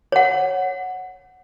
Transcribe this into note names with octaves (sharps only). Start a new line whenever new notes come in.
C#5 F#5